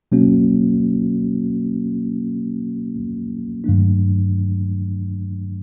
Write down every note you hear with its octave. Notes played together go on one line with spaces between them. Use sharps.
B2 F#3 A#3 C#4 F#4
G2 D#3 F#3 A3 D4